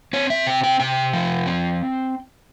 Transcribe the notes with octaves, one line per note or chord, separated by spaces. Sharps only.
C4 C#5
E5
C3 G5
G5
C3 G5
F3
C4